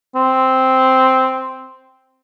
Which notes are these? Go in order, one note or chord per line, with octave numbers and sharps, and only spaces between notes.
C4